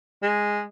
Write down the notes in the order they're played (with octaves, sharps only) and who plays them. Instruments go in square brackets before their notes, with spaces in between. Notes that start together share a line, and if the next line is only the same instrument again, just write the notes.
[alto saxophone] G#3